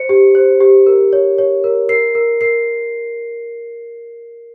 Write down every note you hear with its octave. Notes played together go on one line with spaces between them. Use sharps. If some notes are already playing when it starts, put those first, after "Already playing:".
Already playing: C5 C#7
G4
C5
G4
A#4
C#5
C#5
A#4
A#4 C7
A#4
A#4 C7